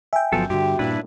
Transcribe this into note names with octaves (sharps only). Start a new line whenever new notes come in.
E5 G5 G#5
G1 F3 F#3 B3 A4
G2 D3 F#4 G4
G2 A#2 D4 E4 B4